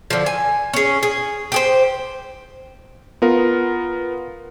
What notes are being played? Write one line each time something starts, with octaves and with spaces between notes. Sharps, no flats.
D3 F3
G#5
C#4 G#4
G#4
G4 G#4 C5
B3 F4 A#4